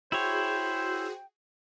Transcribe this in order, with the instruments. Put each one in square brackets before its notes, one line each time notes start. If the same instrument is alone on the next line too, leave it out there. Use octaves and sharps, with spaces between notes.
[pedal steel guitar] E4 C#5 [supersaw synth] F#4 G#4 [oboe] C5 [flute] G5